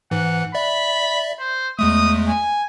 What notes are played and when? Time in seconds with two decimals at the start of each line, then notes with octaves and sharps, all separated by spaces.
0.11 G#2 E3 F#5
0.55 D5 E5 B5
1.39 C5
1.79 E2 G#3 A3 D#6
2.28 G#5